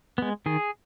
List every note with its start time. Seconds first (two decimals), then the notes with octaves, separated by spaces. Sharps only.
0.18 G#3 B3
0.46 D#3 G#4